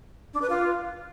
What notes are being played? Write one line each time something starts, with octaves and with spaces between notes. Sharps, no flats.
D4
B4
F4